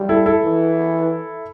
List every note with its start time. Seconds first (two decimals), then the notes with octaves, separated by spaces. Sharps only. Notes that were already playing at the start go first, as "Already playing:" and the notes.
Already playing: G3
0.09 E4 A4
0.26 E4 A4
0.43 E3